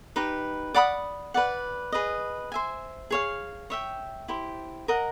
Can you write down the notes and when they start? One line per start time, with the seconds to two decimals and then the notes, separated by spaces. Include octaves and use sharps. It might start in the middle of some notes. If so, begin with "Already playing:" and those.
0.16 D#4 G4 B4
0.75 D5 F#5 B5 D#6
1.34 B4 D5 F#5
1.92 G#4 B4 D#5
2.52 C5 E5 G#5
3.11 G#4 C#5 F5
3.70 C#5 E5 G5
4.28 E4 G4 C5
4.88 A#4 D#5 F#5 A#5